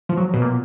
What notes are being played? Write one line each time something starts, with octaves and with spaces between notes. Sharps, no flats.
F3
F#3
B2
A#2